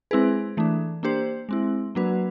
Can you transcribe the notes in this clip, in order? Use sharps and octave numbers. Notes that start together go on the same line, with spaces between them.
G#3 C4 E4 G#4 B4
E3 A3 D4
A#3 D4 G4 C5
G#3 C4 E4
F#3 A#3 D4 F#4 B4